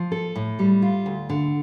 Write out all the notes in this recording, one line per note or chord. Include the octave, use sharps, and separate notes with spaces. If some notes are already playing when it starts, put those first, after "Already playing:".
Already playing: F3
A4
A2
G3
F4
D2
D3